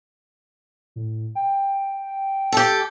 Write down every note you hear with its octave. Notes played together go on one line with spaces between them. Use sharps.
A2
G5
G4 A4